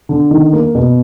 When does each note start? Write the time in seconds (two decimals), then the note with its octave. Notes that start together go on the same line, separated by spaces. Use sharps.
0.09 D3
0.31 D#3
0.53 A#3
0.75 B2